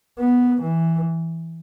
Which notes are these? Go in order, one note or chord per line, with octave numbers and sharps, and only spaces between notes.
B3
E3